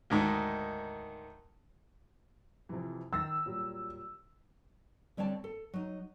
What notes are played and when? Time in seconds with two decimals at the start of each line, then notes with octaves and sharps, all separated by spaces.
0.10 D2 G#2 D#3
2.69 F2 C3 E3
3.13 D#3 E6 A6 A#6
3.46 A#2 F#3 G3
5.17 D3 G3 C4 C#5 D5 A5
5.44 A4
5.74 F#3 D#4